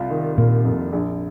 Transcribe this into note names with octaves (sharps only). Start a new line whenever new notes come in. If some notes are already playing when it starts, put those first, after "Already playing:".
Already playing: C2 F4
D#3
A#2 A#3
F2
A#1